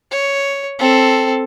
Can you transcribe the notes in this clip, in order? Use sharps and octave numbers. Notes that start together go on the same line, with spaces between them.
C#5
C4 A4